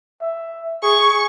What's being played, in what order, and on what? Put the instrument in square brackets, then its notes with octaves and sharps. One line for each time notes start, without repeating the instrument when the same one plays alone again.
[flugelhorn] E5
[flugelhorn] G#4 [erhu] C#6